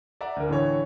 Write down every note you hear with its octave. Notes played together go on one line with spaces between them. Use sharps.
D5 E5 F#5 A#5
D2 A#4
A2 D3 E3 A4 C#5